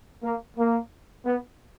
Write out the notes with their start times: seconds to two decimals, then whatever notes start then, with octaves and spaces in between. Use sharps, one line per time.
0.23 A#3
0.57 A#3
1.26 B3